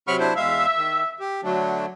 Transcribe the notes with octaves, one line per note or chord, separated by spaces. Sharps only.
C3 F#3 B5 C#6 F6
D4 E4 C5
E2 G#3 E5 F5
D#3
G4
D3 F#3 A3 D4